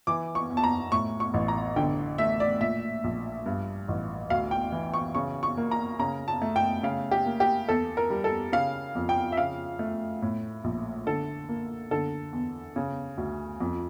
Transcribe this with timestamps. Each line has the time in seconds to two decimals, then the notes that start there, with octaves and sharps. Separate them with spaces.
0.07 E3 D6
0.35 C#6
0.50 E2
0.57 A5
0.64 A#5
0.92 A2 C#6
1.20 C#6
1.34 A1
1.48 A#5
1.76 D3 G5
2.18 A3 E5
2.40 D5
2.60 A#2 E5
3.04 A#1
3.46 G2
3.88 A1
4.30 D2 F5
4.51 G5
4.72 E3
4.94 C#6
5.15 C#3 C#6
5.43 C#6
5.57 A#3
5.71 A#5
5.99 C#3 A#5
6.28 A5
6.42 A3
6.56 G5
6.83 C#3 F5
7.11 G4
7.26 A#3
7.40 G4
7.68 E2 A4
7.97 A#4
8.10 G3
8.24 A4
8.52 C#3 F5
8.95 F2
9.09 G5
9.32 E5
9.37 C#3 F5
9.79 A3
10.22 A2
10.64 A#1
11.06 D3 A4
11.49 A#3
11.91 D3 A4
12.33 E2
12.76 C#3
13.18 D2
13.60 F2